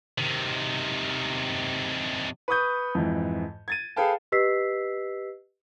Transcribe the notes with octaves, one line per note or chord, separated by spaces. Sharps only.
C3 D#3
B4 C#6 D#6 G6
F2 G#2 E3
G#6 A6 D#7
G#4 A4 B4 F5 G5 A5
G4 B4 D#5 E6 B6 C7